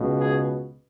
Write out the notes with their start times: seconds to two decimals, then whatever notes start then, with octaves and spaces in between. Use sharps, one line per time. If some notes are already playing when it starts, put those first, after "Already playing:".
Already playing: C#2 B2
0.20 G#4